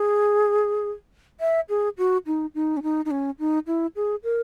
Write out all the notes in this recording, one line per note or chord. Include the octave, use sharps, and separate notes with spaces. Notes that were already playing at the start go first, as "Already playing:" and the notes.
Already playing: G#4
E5
G#4
F#4
D#4
D#4
C#4
D#4
D#4
C#4
D#4
E4
G#4
A#4